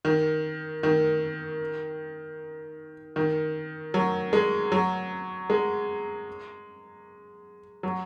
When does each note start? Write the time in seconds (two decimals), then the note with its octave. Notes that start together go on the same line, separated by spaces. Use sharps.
0.05 D#3
0.83 D#3
3.16 D#3
3.94 F#3
4.33 G#3
4.72 F#3
5.50 G#3
7.83 F#3